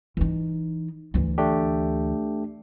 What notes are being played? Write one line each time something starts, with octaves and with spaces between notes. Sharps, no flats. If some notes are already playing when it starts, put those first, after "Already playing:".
E3 D#4
D2 E3
A3 D4 G4